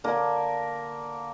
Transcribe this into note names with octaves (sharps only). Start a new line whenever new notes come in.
D3 A#3 G#5